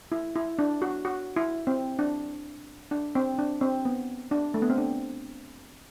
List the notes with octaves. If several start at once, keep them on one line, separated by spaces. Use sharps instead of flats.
E4
E4
D4
F#4
F#4
E4
C4
D4
D4
C4
D4
C4
B3
D4
A3
B3
C4
D4